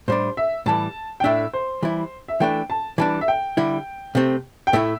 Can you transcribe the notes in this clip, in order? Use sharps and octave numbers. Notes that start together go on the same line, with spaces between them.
A2 G3 D4 C5
E5
A2 E3 G3 A5
G5
A2 A3 D4 E5
C5
E3 G3 E4
E5
E3 A3 D4 G5
A5
E3 G3 D4 A5
E5
G5
D3 G3 E4
C3 A3 C4
G5
A2 A3 E4 E5